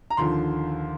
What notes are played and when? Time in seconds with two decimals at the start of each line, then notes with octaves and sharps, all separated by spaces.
0.10 A#5
0.17 D#2 D3 F3 C6